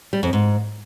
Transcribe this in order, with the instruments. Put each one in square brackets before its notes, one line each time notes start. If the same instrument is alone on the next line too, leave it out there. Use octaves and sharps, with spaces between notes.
[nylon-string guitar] G3
F2
G#2